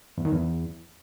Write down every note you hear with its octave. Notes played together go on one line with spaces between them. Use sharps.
E2
D#3
E2